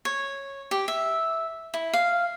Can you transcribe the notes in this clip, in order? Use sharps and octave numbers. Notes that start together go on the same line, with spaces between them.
C#5
G4
E5
E4
F5